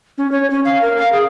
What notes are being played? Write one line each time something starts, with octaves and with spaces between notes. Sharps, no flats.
C#4
C#5
C#4
F5
A#4
F5
G#4